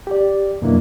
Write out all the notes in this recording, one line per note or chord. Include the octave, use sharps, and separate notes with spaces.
G4 D5
F2 B2 F#3 A#3 D4 E4